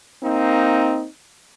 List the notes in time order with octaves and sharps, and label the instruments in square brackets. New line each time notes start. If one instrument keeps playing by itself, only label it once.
[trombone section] A#3 C4 D#4